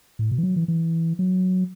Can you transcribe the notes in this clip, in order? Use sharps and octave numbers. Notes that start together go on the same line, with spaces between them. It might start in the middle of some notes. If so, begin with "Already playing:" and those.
A2
B2
E3
F#3
E3
E3
F#3